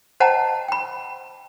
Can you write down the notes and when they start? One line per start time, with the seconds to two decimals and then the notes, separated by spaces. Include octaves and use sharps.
0.20 C5 D#5 F#5 G5 A5 A#5
0.68 G5 B5